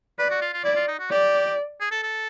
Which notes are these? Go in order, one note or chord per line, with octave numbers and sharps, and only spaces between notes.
B4 D5
F#4
F4
F4
E4 D5
F4
D#4
F#4
G4 D5
G#4
A4
A4